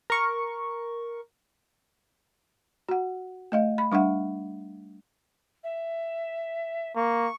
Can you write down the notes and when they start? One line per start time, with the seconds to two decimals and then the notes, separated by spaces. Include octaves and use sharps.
0.10 A#4 C#6
2.89 F#4 F#5
3.52 A3 D#5 F5
3.78 B5
3.92 G3 D4 E5 F#5
5.63 E5
6.95 A#3 C#6